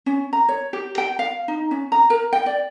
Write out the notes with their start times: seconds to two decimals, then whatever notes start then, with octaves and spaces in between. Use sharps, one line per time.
0.06 C#4
0.33 A#5
0.49 C#5
0.73 G4
0.98 G5
1.19 F5
1.48 D#4
1.71 C#4
1.92 A#5
2.10 A#4
2.33 G5
2.46 D5